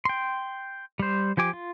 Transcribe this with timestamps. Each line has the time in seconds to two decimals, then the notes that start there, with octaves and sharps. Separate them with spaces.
0.05 G5 C6
0.99 G3 C5
1.37 F3 G4 G#5 D6
1.53 F4